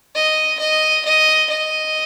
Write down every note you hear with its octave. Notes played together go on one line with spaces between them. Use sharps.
D#5
D#5
D#5
D#5